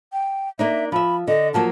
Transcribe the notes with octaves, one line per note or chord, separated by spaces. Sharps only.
G5
A#3 D4 D#4 E5
F3 E5 B5
D3 D#5
F3 F#3 A#3 A5